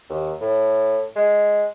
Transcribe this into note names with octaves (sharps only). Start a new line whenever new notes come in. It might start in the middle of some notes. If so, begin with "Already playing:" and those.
D#2
A2
G#3